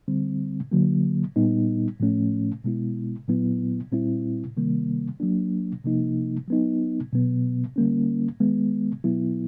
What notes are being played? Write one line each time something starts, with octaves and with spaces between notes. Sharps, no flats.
D3 G3 C4
D3 F#3 A#3
A#2 G3 B3 D#4
A2 F3 A3 C#4
B2 G#3 B3 E4
A#2 F#3 B3 E4
A#2 G3 C4 E4
C3 D#3 G3 A#3
F#3 A#3 D4
C3 F3 A#3 D#4
F#3 B3 D#4
B2 F#3 B3
D3 G3 A#3 C#4
D#3 G#3 B3
B2 F#3 B3 E4